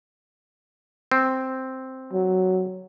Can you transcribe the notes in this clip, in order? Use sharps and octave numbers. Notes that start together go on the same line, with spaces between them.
C4
F#3